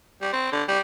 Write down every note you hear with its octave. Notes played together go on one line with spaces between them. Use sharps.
G3
C4
D3
G3